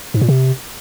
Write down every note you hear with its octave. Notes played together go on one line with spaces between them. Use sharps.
G#2
A#2
C3